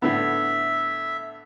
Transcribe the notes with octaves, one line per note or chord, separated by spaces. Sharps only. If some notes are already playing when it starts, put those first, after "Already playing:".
A2 D3 B3 E5